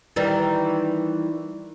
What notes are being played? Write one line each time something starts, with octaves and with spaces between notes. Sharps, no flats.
D#3 E3 G3